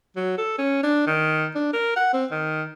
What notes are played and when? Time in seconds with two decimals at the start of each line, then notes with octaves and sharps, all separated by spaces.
0.16 F#3
0.38 A4
0.58 C#4
0.83 D4
1.07 D#3
1.55 D4
1.73 A#4
1.96 F#5
2.13 C4
2.31 D#3